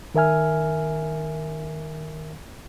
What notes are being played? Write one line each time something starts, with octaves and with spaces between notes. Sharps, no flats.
D#3 A#4 E5 G#5 F6